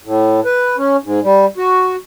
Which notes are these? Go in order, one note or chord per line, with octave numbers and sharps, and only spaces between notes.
A2
B4
C#4
G#2
G3
F#4